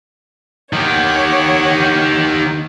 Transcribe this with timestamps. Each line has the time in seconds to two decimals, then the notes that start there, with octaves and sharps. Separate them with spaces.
0.73 D#3 G4 C#5 F#5